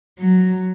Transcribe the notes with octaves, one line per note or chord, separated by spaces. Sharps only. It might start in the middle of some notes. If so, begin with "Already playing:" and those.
F#3